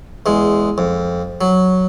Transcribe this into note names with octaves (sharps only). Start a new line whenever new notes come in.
E2 G#3
F2
F#3